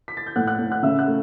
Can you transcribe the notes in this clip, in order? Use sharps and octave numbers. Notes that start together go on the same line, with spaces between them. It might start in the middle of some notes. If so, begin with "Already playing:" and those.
B6
A6
G6
A2 F#5 F#6
F#5 F#6
A2
F#5 F#6
C#3 E5 E6
F#5 F#6
A3